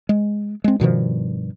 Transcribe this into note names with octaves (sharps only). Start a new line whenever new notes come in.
G#3
G#3 C4
G2 B2 D#3 F3